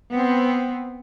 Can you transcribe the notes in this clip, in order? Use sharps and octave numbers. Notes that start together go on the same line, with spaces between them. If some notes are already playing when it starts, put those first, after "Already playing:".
B3 C4